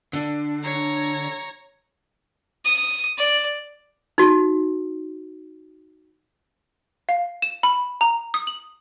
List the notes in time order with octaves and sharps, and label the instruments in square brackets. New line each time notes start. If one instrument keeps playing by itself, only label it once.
[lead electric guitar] D3 D4
[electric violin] C#5 A#5
[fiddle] D#6
D5
[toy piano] D#4 F#4
[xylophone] F5
E7
B5
A#5
D#6
F#7